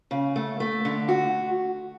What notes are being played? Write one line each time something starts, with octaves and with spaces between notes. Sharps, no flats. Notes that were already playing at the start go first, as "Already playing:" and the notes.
C#3
A3
A3
D3
F#4